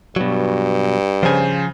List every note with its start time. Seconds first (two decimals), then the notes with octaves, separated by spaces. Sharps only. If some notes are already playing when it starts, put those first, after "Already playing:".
0.16 G2 B2 F#3
1.23 C#3 F3 C5 G#5